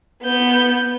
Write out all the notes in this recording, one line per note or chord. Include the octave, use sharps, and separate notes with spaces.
B3 G6